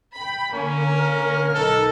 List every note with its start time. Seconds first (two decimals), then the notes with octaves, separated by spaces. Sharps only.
0.15 G5 B5
0.54 D3 A#3 C#4
0.95 A#4
1.54 B1 D#4 A4